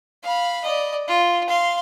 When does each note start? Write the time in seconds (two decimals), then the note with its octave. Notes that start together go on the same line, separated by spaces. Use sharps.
0.23 F5 B5
0.64 D5 D#5
1.08 F4
1.48 F5 C6